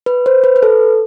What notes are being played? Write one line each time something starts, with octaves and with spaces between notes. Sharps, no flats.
B4
C5
B4
B4
A4